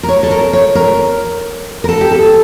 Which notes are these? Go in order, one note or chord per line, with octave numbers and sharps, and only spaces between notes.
A#4
C#5
A4
A#4
C#5
A#4
A#4
A4
G4
A4